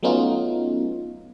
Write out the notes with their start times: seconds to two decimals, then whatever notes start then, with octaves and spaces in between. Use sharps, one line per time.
0.03 F#3 A3 B3 C#4 D#4 F4